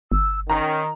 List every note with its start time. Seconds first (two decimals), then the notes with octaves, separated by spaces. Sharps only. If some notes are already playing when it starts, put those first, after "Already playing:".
0.12 G1 E6
0.50 D#3 C#4 A#5